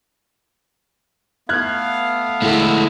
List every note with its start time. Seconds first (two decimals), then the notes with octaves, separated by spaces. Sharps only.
1.49 A3 B3 F5 F6 F#6 G#6
2.42 A2 D3 G#3 E4